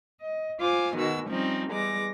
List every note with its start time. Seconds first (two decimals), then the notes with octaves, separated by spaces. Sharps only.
0.20 D#5
0.60 F4 C5 G#5 D6
0.94 B2 D#3 G#3 F#4 E6
1.29 F3 G3 C4 C#4 D#4
1.70 E2 G3 G#3 D6 A#6